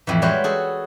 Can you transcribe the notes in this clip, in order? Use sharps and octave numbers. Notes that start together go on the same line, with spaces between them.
F2 A2 E3
G3 G#3 F#4 B4 C#5 E5
F#4 G#4 A4